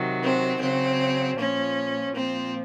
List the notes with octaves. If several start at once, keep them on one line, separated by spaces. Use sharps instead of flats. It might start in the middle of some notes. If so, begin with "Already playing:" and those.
Already playing: C3 D#3 F#3
C4
C#3 F#3 C4
A#2 F3 C#4
A#2 F3 C4